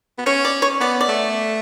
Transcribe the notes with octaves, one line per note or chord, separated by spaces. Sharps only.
B3
C#4 C#5
D5
C#5
B3 D5
D5
A3